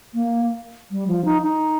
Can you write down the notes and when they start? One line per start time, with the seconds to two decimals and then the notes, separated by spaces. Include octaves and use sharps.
0.14 A#3
0.91 G3
1.07 F3
1.25 D#4
1.42 D#4